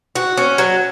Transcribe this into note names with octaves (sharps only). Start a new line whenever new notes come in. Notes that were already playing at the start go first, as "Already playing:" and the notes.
F#4
C#4
F#3